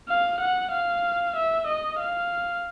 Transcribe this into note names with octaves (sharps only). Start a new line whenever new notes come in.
F5
F#5
F5
E5
D#5
F5